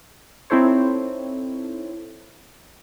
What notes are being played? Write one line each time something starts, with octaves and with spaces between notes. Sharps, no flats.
C4 D#4 E4 A4 C5 C#5